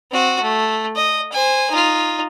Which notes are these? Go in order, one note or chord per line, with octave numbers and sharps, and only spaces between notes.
C4 F#4
A3
D#5
C5 G#5
D#4 F4